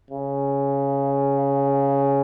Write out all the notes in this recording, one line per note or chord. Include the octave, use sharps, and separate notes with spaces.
C#3